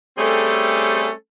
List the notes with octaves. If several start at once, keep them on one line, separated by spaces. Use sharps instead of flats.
G3 A3 C4 C#4 G#4 A4